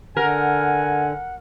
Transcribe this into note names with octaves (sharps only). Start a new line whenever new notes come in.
D3 A#4 F#5 G#5